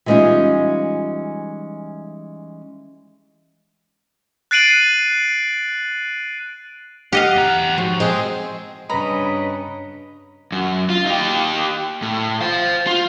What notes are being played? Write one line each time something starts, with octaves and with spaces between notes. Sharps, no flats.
E3 G3 G#3 C#4 D#4 F4
F#6 A6 C7 D7 D#7 F#7
G4 D#5 F5 F#5
E2 A#5
G#2 F3 F#4
G#3 C4 G#4 C5
G2 C#3 C#4 B4 D#5 A#5 B5
F#2
F4
D#4 G4
A2
C5 F5
F4